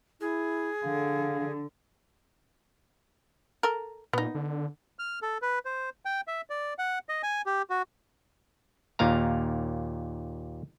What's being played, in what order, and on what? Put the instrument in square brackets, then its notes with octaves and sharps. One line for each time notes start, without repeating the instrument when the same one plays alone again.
[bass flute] E4 [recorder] G#4
[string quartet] D3 [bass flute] F5
[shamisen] A4 A#4
[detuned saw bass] A#2 [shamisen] B3 D#4
[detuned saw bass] D3
[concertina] F6
A4
B4
C5
G5
E5
D5
F#5
D#5
G#5
G4
F#4
[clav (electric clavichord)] D#2 A#2 F5 A#5